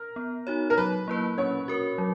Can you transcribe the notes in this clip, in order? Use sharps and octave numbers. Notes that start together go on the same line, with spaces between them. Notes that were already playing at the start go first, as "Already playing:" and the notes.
Already playing: A#4
B3
D#4 F#4 C#5
A#4
F#3 B4
A#3 E4 B4
C#4 C#5
F#4 A#4
F#3